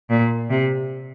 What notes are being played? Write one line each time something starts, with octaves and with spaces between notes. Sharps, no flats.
A#2
C3